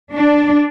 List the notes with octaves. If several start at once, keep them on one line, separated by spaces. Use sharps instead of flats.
D4